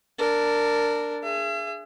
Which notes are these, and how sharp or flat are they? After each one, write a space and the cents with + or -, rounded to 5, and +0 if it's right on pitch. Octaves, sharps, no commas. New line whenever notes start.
D4 +0 A#4 -15
G#4 +0 E5 +40